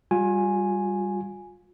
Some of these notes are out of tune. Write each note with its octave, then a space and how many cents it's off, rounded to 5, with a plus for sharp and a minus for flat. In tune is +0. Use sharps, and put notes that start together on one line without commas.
G3 +10 F4 +35 G#5 +0